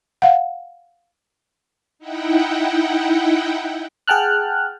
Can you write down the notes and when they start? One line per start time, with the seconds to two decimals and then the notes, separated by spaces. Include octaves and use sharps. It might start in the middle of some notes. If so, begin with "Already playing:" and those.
0.22 F5 F#5
1.99 D#4 E4 F#5 G5
4.08 G#4 F#5 G5 A5 F6 F#6